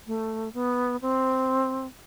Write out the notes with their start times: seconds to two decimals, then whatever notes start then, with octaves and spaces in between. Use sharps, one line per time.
0.07 A3
0.54 B3
1.02 C4